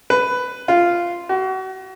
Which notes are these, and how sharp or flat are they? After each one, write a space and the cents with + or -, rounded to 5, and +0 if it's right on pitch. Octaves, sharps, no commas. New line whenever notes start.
B4 +10
F4 -5
F#4 +35